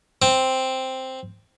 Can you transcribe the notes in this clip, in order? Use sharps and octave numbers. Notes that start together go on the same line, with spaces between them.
C4